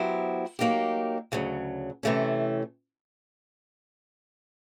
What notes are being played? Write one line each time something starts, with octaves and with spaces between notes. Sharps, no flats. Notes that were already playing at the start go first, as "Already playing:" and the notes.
Already playing: F#3 B3 E4 G4 C5
F#3 A#3 D#4 G4
D2 C#3 F#3
C3 E3 A3 C#4